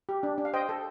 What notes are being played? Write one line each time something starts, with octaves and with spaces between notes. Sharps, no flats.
G4
D4
D4
F5
C5 D#5 G5
A4